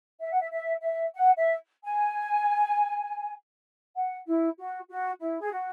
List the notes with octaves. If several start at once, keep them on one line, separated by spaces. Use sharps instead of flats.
E5
F#5
E5
E5
E5
F#5
E5
G#5
F#5
E4
F#4
F#4
E4
G#4
F#4